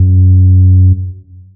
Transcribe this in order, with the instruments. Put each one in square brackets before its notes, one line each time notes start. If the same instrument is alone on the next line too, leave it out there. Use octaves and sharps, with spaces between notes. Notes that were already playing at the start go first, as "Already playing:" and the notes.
Already playing: [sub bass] F#2